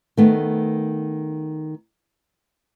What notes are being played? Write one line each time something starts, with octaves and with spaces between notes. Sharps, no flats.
D#3 A3 B3